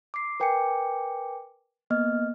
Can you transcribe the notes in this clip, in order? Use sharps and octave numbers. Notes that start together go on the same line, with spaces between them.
D6 C7
A#4 B4 G5 G#5 D6 C#7
A#3 B3 D#5 F6